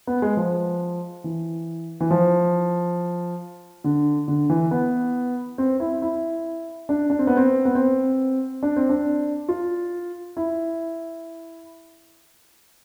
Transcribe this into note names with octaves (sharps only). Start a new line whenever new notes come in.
B3
G#3
F3
E3
E3
F3
D3
D3
E3
B3
C4
E4
E4
D4
D4
C4
B3
C4
B3
C4
D4
C4
D4
F4
E4